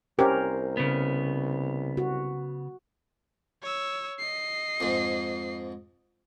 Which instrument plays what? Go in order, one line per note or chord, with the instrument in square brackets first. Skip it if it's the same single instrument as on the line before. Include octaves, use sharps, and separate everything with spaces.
[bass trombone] C2 [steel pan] C#4 G4 [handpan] A#4 C5
[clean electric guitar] C#3 B3
[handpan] F#4
[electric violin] C#5 E6
D#5 C7
[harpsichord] F2 G#2